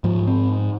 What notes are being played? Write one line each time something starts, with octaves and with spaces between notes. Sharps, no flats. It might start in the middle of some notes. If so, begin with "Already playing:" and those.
G#2 F3
C4